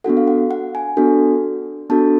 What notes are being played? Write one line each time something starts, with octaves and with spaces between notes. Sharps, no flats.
B3 D4 F#4 A4 F#5
F5
F#5
F#5
G#5
B3 D4 F#4 A4
B3 D4 F#4 A4 A5